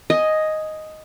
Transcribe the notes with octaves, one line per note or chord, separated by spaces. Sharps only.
D#5 G#5